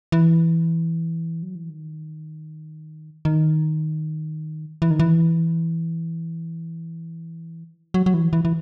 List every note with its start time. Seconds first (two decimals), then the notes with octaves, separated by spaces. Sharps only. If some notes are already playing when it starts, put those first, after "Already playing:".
0.12 E3
1.43 F#3
1.55 E3
1.70 D#3
3.25 D#3
4.82 E3
4.91 D#3
4.99 E3
7.94 F#3
8.06 F#3
8.14 E3
8.33 E3
8.45 E3